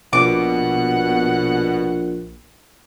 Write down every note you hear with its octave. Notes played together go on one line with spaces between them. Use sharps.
A#1 B2 F#5 D6